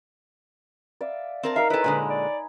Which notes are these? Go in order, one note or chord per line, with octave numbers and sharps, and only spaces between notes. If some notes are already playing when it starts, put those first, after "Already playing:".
D5 E5 F5
C4 A#4 A5
D#4 A#4 E5 F5 A#5
E4 A4 B4 C#5 D#5 G#5
A#2 D3 G#3 G#5 A#5 B5
D5